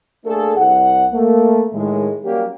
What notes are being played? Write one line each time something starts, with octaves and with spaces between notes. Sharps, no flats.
A3 A#3 D4 G#4 A4
C2 F#5
A3 A#3
A2 D#3 G#3
F#3 G3 A#3 C#4 G4